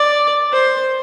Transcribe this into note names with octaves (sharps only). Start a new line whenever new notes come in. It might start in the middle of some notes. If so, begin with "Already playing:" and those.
Already playing: D5
C5